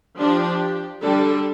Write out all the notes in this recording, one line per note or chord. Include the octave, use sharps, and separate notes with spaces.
F3 D4 G4
D3 G3 D4 A4